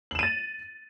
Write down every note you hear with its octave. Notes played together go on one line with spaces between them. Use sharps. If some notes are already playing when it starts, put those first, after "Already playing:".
A6 D#7 E7 F#7